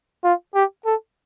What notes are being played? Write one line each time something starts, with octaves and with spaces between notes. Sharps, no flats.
F4
G4
A4